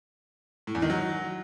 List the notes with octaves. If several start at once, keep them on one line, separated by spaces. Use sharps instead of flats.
A2
E2
D#3
F#3